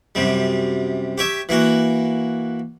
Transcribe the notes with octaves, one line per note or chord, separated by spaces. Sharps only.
F#2 C3 G3
G4 C#5 E5
E3 A#3 F#4